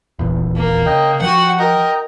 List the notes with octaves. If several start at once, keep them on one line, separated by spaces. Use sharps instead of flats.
D#1 A#1 E2
A#3
C#3 D#5 G5
F3 F#4 F#5 G5
A#4 D#5 G5 A#5